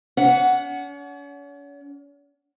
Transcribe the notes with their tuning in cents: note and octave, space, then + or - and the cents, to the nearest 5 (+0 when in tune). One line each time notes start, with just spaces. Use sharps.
C#4 +40 F#5 +0